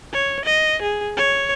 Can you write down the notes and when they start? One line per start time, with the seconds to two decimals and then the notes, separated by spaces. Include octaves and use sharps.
0.13 C#5
0.45 D#5
0.82 G#4
1.17 C#5